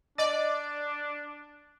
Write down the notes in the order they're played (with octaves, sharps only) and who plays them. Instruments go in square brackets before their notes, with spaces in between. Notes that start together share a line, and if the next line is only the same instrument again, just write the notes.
[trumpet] D4 [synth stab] D5 [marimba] D#5